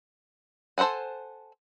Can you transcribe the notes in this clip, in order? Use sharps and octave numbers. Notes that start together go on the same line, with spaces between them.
A4 C5 E5 F#5 G#5